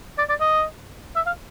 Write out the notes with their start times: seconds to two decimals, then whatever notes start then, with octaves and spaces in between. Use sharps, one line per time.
0.18 D5
0.29 D5
0.40 D#5
1.16 E5
1.26 F5